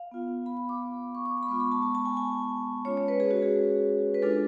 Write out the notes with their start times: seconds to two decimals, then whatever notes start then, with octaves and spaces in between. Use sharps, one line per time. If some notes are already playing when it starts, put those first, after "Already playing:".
Already playing: F5
0.11 B3 F4
0.46 B5
0.57 B5
0.69 D6
1.15 C#6
1.26 D6
1.38 D6
1.43 B5
1.48 G#3 B3 F4 C#6
1.60 B5
1.71 A5
1.82 A5
1.95 A5
2.05 G#5
2.17 G#5
2.85 G#3 C#4 F4 C#5
2.97 C#5
3.08 B4
3.20 G#4
3.31 F#4
3.42 G#4
4.14 B4
4.22 G#3 D4 F4 A4